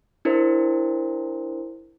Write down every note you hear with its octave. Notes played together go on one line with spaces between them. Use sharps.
D4 E4 A#4 C5